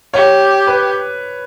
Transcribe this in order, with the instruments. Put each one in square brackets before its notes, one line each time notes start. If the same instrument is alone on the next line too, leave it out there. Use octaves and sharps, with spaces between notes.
[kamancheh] G4 [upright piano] C#5
[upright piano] B4